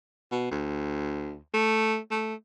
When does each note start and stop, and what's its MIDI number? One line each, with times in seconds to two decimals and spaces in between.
0.31 0.46 47
0.51 1.36 38
1.53 1.98 57
2.11 2.34 57